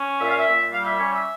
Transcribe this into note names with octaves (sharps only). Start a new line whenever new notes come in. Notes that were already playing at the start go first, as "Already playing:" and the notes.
Already playing: C#4
A#2 E5
F5
E5
A#2
G3 F5
E5
C#4 C#5
E5